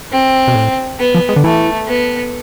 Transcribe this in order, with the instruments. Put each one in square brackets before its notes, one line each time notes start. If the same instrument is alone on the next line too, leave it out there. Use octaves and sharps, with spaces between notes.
[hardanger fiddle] C4
[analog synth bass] B2
A2
[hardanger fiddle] B3
[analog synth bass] F3
G#3
D3
[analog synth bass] E3 [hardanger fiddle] A3
[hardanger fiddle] B3